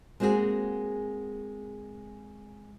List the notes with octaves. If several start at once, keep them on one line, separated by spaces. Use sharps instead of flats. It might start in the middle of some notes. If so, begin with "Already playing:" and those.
G#3 A#3 C4 F#4 G#4